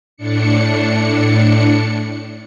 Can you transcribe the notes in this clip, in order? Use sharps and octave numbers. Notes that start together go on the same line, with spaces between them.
A2 D4 C#7